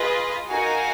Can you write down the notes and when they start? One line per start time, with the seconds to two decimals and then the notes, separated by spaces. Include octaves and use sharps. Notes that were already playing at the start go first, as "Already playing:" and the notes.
Already playing: F4 G#4 B4 D#5
0.49 D#4 F#4 A#4 F5 G#5